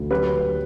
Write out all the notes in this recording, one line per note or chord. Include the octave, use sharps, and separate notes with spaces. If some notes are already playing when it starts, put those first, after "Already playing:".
Already playing: D2
F#3 G4 B4
F#3